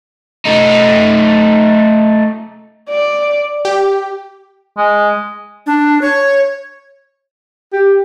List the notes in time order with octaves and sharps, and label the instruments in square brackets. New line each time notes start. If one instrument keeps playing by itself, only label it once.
[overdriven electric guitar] A3 D#4
[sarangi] D5
[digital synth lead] G4
[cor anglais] G#3
[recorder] D4
C#5
[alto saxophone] G4